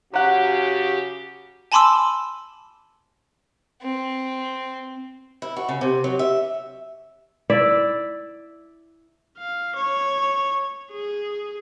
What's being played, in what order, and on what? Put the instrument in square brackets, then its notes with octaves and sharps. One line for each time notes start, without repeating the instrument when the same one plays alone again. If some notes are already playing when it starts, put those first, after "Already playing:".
[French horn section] C#3 F#4 [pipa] F#3 F#5 [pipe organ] G4
[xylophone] G#5 A5 B5 C6 D6 E6
[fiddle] C4
[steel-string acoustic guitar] E4
F#4
C#3
C3
F#3
E5
[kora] E4 D5 E5
[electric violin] F5
C#5
G#4